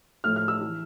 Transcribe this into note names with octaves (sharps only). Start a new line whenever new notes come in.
A2 F3 A3 F6
F6
E6
E3